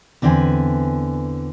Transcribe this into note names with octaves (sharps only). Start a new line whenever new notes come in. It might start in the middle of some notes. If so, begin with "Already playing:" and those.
E2 D3 C4 B4 G#5